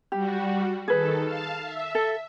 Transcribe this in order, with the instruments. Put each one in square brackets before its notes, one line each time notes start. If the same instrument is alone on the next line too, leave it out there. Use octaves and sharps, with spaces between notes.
[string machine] G3 F#4 [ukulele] G4
[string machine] D#3 A4 [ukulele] G#4 B4
[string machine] F5 A5
E5
[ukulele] A4